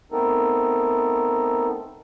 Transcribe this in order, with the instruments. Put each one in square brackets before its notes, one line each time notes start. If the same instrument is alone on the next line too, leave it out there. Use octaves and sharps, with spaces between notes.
[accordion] A3 B3 C4 D#4 A4 A#4